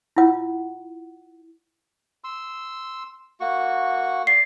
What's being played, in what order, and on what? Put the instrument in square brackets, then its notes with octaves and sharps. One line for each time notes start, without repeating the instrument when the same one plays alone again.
[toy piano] E4 F4 F#5
[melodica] C6 E6
A#3 F#4 C#6
[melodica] D5 [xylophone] C7